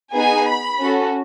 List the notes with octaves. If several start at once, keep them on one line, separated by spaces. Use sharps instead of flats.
B3 D#4 G#4 G#5
B5
C#4 F#4 A4